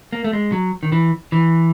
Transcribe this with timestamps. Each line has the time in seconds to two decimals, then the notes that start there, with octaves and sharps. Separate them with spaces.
0.13 A#3
0.24 A3
0.33 G#3
0.52 F#3
0.83 D#3
0.92 E3
1.32 E3